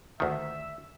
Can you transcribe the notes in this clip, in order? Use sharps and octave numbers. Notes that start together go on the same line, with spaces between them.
D2 D#3 E5